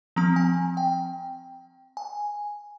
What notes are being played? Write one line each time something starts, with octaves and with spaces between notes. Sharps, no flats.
F3 C4 A#5
G#5
G5
G#5